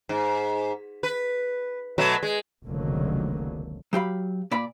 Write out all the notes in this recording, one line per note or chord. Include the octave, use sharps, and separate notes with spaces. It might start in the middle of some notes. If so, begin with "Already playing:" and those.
G#2
B4
B2 F#3 A3
G#3
F1 C#2 D3 D#3 F#3 A#3
F#3 G4 F5 B5
A#2 D5 B5